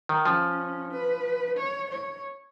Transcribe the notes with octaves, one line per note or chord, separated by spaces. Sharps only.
D#3
F3 C#4
B4
C#5
C#5